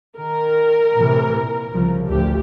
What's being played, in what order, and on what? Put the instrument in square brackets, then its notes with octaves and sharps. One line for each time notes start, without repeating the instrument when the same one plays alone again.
[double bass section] D#3 [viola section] A#4
[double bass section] A2 C3 E3
A#2
C2 C#3 F3
[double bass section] A1 D2 F3 [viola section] G4